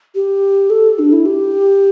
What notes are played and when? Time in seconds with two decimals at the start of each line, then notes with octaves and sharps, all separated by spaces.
0.15 G4
0.70 A4
0.99 D4
1.13 E4
1.26 G4